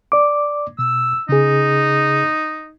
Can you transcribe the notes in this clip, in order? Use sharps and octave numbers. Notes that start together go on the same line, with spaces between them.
D5 D6
B2 E6
C#3 D#4 G#4